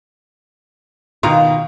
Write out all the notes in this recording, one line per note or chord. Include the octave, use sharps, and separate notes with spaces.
B2 D#3 F4 A#5